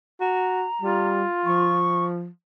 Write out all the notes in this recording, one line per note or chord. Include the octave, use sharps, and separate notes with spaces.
F#4 A#5
G3 F4
F3 C#6